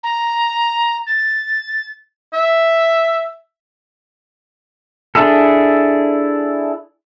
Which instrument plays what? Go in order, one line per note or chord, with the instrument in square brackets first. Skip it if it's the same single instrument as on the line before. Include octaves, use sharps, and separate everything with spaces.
[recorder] A#5
A6
[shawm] E5
[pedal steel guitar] D4 E4 G#4 A4